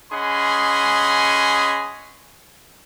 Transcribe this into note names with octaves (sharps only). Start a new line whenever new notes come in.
C#4 G#4 D#5 F#5 B5 C6